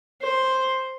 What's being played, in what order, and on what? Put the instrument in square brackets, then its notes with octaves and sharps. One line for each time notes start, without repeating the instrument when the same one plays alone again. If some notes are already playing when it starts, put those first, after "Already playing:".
[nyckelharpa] C5